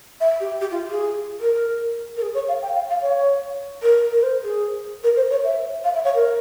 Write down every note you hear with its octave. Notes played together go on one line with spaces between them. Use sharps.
E5
G4
G4
F4
G#4
A#4
A#4
G#4
C#5
F5
G5
F5
F5
C#5
A#4
A#4
C5
G#4
A#4
C5
C#5
E5
F5
E5
C#5
A#4